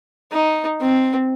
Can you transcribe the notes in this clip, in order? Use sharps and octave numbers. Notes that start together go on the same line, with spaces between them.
D#4
C4